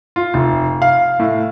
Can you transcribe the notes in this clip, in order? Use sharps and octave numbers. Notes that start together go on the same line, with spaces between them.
F4
F1
F5
A2